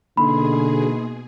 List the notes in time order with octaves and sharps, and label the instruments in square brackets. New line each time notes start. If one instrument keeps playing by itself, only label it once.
[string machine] B2 G#4 [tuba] D3 [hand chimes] A#3 D#4 C6 [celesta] B5